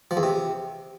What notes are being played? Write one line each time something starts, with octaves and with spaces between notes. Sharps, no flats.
F3
E2
C3